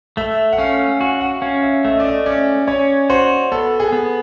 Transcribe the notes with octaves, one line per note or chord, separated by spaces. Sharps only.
A3 E5
F#5
C#4 F5
F#4 G#5
F#5
C#4 F5
E5
A3 E5
D#5
D5
D#5
C#4 D5
C#4 C#5
F#4 C5
B3 A4
G#4
B3